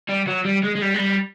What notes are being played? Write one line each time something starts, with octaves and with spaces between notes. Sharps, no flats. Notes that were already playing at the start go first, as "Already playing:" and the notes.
G3
F#3
G3
G#3
G#3
G3
G#3
G3